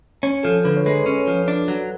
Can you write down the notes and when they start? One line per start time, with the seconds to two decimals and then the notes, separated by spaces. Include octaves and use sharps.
0.23 C#4
0.43 F3 A4
0.64 D3 B4
0.76 C#5
0.86 G#3 B4
1.06 C#4
1.27 F3
1.48 D4
1.68 F#3